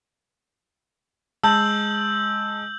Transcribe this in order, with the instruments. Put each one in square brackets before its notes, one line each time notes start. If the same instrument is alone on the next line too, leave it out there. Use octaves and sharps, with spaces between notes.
[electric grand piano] G#3 [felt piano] A5 [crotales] E6 G6 F#7